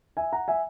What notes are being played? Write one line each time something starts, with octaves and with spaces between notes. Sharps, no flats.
E5 G#5
F#5 A#5
E5 G#5